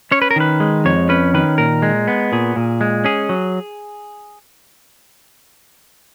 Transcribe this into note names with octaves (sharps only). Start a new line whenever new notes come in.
C#4 C#5
B4
A#4
D#3 B4
G#3
F2 C#5
C#4 B4
D#3 B4
A#2 A#4
G#3
B3
A#2 G#4
A#2
G#3
C#4 G#4
F#3